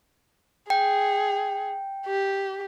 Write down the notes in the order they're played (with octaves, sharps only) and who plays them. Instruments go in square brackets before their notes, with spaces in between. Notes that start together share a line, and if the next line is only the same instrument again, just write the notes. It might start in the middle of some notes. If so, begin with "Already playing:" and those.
[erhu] G#4 [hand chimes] G5
[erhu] G4